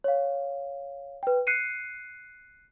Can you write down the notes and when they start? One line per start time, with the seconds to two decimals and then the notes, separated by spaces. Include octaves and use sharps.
0.04 C#5 F5
1.23 B4 G5
1.47 F#6 C7 C#7 D#7